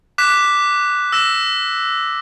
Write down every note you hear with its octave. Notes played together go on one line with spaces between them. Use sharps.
D6 F#6 B6 E7
E6 A#6 E7